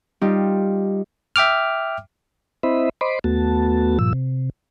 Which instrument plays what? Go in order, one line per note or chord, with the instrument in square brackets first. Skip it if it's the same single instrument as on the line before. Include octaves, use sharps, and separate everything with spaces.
[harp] G3 D#4 F4 G4
[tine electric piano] E5 G5 D6 F6
[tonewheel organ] C4 E4 C5 D#5 E5 B5
C5 D#5 B5 C6 D6
D#2 A3 B3 F#4 A5
G2 A#2 F3 E6
C3